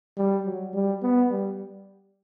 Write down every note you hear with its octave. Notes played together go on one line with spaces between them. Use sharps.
G3
F#3
G3
B3
G3